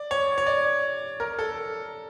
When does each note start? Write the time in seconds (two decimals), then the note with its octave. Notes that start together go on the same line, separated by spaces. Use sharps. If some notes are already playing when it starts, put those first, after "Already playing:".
Already playing: D5
0.11 C#5
0.38 C#5
0.46 D5
1.20 A#4
1.39 A4